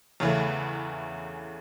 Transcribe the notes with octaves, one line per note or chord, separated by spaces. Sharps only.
E2 C#3 E3 A3